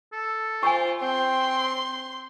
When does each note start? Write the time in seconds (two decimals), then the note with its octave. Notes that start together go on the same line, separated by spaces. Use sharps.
0.13 A4
0.63 F4 C5 G#5 C#6
1.02 C4 G5 C6